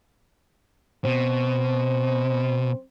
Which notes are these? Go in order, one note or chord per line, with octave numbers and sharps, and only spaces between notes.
B2 C4